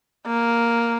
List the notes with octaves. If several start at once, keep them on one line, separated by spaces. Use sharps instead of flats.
A#3